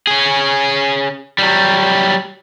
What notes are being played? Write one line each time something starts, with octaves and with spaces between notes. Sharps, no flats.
C#4 G#4
F#3 G3